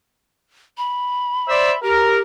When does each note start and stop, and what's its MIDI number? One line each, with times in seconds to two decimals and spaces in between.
0.78 1.82 83
1.48 1.73 72
1.48 1.73 74
1.48 1.73 76
1.83 2.22 67
1.83 2.18 70